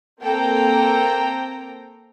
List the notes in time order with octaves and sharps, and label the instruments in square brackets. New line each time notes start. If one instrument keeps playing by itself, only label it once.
[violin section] A#3 C4 A4 G5 A#5